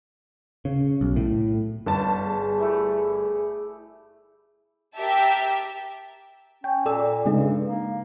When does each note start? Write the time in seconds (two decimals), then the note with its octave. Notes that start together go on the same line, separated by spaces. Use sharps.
0.65 C#3
1.01 B1
1.16 A2
1.86 G1 A5
2.22 G#4
2.58 A3 E4 G4
4.97 G4 A#4 E5 G5 A5
6.64 C#4 G5
6.86 A#2 A4 D5 E6
7.26 G2 C#3 G#3 D#4
7.66 A#3